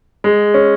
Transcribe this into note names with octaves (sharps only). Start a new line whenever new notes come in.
G#3
C#4